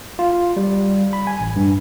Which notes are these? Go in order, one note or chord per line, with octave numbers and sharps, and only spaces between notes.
F4
G3
B5
G#5
A1
G2